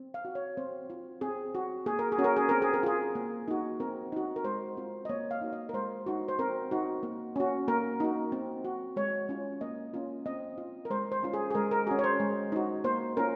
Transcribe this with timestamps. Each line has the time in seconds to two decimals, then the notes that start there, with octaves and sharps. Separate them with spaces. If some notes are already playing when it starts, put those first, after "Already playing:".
Already playing: C4
0.14 F5
0.25 F#4
0.35 C#5
0.57 C4 C5
0.90 F4
1.21 C4 G#4
1.55 F#4
1.86 A#3 G#4
1.99 A#4
2.12 G#4
2.18 C#4 F#4
2.24 A#4
2.37 G#4
2.49 C4 A#4
2.62 G#4
2.74 A#4
2.83 F4 G#4
3.15 A#3
3.48 D#4 F#4
3.80 C4 A#4
4.12 D#4 F#4
4.36 A#4
4.44 G#3 C5
4.77 C4 F4
5.05 D#5
5.09 A#3 C#5
5.31 F5
5.41 D#4 F#4
5.52 D#5
5.69 A#4
5.73 G#3 C5
6.06 D#4 F#4
6.28 C5
6.39 C4 A#4
6.71 D#4 F#4
7.03 A#3
7.36 C#4 F#4
7.68 A#3 A#4
8.00 D#4 F#4
8.32 C4
8.65 F#4
8.96 G#3 C#5
9.29 C#4 F4
9.61 A#3 D#5
9.94 C#4 F4
10.26 C4 D#5
10.58 F4
10.85 A#4
10.90 G#3 C5
11.12 C5
11.23 C#4 F4
11.34 G#4
11.51 G#4
11.55 G#3 A#4
11.71 A#4
11.87 C#4 F#4 G#4
11.99 C#5
12.04 C5
12.20 G#3
12.52 D#4 F#4
12.84 A#3 C5
13.17 C#4 F4 A#4